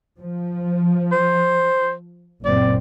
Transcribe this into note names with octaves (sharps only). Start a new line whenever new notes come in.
F3
C5
F#1 A#2 C4 D5